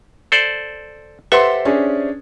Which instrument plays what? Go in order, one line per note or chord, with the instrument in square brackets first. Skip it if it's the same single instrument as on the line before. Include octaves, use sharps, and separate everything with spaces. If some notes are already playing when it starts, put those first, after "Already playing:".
[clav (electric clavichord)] A4 C5 D5
[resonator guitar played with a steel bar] G4 C5 E5 [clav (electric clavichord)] A4 [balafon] B4 [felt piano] F#5 C6
[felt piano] C#4 D4 G#4